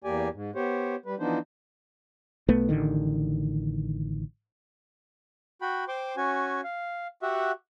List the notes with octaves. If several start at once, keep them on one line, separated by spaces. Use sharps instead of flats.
E2 A#3 G4 D5 G#5
G#2
B3 G4 C5 C#5
G3 B4
E3 F3 B3 D4 D#4 C5
B1 A3 B3
A1 D3 D#3
F#4 G5 B5
C5 G5 C6 D6
C#4 F#4 G#5
F5
F#4 G4 E5 F#5